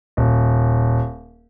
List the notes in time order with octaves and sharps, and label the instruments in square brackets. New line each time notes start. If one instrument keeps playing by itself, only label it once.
[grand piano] D#1